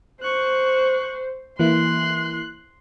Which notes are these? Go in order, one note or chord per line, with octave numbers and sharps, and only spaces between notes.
C5 C#6 F#6
E3 A#3 E4 C6 F#6